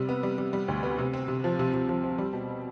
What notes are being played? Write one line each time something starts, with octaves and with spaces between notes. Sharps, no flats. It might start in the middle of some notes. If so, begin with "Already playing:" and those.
Already playing: C3 G3
B3
G3
G3
G3
D2
B3
C3
C4
C3
F3
C3
C3
F3
C4
G3
B2